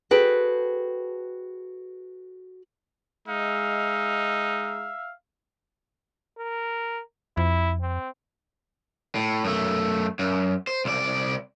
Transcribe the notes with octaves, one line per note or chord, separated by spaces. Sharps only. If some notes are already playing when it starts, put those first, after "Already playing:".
F#4 G#4 A4 B4 C5 G5
G#3 D#4 E5 F5
A#4
F2 E4
C4
A2
F#2 A3
F#2
C5
C2 D5